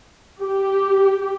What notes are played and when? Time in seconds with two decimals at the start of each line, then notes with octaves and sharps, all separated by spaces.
0.41 G4